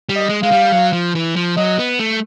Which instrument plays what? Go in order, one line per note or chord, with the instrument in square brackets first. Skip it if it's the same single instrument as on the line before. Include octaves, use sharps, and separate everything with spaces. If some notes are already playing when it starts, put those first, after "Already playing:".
[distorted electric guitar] G3
[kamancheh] D#5
[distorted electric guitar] G#3
[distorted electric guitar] G#3 [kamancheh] F5
[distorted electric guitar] G3
F#3
F3
E3
F3
[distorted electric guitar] F#3 [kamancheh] D#5
[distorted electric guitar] B3
A3